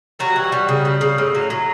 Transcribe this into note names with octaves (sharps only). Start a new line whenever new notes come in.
F#3 G3 F#4
E3
G3
C#3
G3
C#3
A2
F#3
F#3